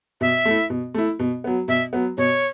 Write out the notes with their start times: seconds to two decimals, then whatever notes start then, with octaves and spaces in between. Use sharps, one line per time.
0.21 B2 E5
0.45 A3
0.51 E4
0.70 B2
0.94 A3 E4
1.19 B2
1.44 F#3 B3
1.68 B2 E5
1.93 F#3 B3
2.18 B2 C#5